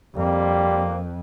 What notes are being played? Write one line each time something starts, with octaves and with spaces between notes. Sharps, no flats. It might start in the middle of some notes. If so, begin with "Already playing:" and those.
F2 G3 A#3 C4